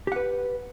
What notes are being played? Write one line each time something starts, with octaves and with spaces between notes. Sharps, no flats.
G4 B4 F#5